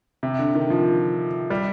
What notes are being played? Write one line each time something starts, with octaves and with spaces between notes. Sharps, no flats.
C3
D3
D#3
F3
G3